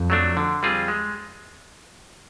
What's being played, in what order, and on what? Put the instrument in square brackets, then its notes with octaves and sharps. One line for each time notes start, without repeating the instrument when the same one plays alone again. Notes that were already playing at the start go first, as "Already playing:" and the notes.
Already playing: [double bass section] F2
[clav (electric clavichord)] F#3 A3 D4
D3
G3 C4 F4 G#4
G#3